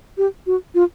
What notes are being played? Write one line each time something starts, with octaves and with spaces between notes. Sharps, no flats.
G4
F#4
F4